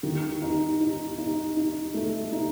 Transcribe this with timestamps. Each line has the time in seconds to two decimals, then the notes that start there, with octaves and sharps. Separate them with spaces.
0.03 D#3
0.42 D#4
0.81 D#4
1.18 D#4
1.57 D#4
1.94 A3
2.32 D#4